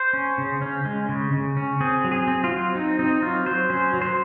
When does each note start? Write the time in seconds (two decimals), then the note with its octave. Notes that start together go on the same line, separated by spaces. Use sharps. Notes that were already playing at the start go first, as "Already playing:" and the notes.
Already playing: C5
0.13 C#4
0.38 C#3
0.62 C#4
0.85 G#3
1.09 C#3
1.33 C#3
1.57 C#4
1.80 C4 G#4
2.04 F#3
2.12 G#4
2.27 C4
2.44 F4
2.52 F#3
2.75 C4 D#4
2.99 C4 D#4
3.22 F#3 F4
3.46 F#3 C5
3.70 C#4 C5
3.93 F#3
4.02 C5